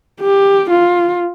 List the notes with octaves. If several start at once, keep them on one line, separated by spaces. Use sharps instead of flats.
G4
F4